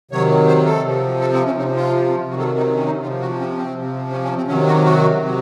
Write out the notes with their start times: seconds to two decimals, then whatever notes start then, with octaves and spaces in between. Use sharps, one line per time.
0.11 C3 D#3 F#3 C#5
0.48 C5
0.66 A4
0.84 C3 F3
1.21 A4
1.34 C4
1.46 C#4
1.57 C3 D#4
1.61 F3
1.76 F4
2.30 C3 D#3 F#3 F#4
2.39 A4
2.48 F#4
2.57 D#4
2.75 C#4
2.85 D#4
3.02 C3 F3 F4
3.21 F#4
3.39 C#4
3.58 C4
3.76 C3 F3
4.11 C#4
4.24 C#4
4.37 C4
4.48 C3 D#3 F#3 C#4
4.67 F#4
4.85 F#4
5.22 C3 F#3